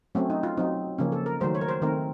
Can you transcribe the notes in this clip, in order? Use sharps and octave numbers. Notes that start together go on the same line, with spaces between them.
F#3 A3 C4 C#4
D#4
F4
F#3 C4 D#4
C#3 F3 A#3 C#4
A4
A#4
D#3 F#3 A3 C5
C#5
A#4
C5
D#3 A3 C4 A#4